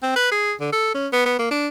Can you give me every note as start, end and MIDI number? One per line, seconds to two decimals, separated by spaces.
0.03 0.12 60
0.16 0.30 71
0.31 0.53 68
0.60 0.72 50
0.72 0.91 69
0.95 1.08 61
1.12 1.24 59
1.26 1.36 59
1.39 1.49 58
1.51 1.68 62